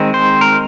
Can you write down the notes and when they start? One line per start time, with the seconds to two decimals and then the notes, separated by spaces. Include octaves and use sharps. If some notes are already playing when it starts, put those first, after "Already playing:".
Already playing: D#3 G#3 C4
0.14 C5
0.41 A#4